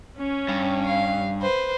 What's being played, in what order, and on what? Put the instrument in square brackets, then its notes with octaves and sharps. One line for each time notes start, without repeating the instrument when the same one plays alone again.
[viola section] C#4
[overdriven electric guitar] G2
[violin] F5
B4 C5